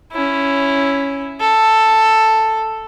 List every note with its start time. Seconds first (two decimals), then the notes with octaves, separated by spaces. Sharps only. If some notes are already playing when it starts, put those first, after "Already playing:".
0.12 C#4 E4
1.41 A4